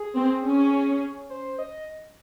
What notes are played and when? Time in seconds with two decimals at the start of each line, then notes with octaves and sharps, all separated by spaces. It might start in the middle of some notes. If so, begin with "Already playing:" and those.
Already playing: G#4
0.16 C4
0.45 C#4
1.30 C5
1.59 D#5